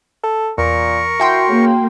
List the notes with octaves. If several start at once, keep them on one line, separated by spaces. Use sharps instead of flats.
A4
E2 A#2 A#4 C#6
E4 F#4 G5 C6
C#3 A#3